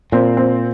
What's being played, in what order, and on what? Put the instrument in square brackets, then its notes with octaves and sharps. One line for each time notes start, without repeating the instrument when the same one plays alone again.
[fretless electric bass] A#2 [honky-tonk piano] C4
[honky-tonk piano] C4